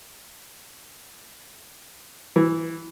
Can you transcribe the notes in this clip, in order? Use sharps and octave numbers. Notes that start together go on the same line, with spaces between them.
E3